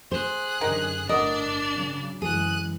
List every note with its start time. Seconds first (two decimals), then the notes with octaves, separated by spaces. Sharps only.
0.12 G#4 C5 F#6
0.61 F#2 D3 D#3 D#4 G4 A#4
1.09 G1 A2 D4 F#4 A#4 D5 D#5
1.74 C#3 F#3
2.22 F#2 E3 G#3 G#4 F#6 D#7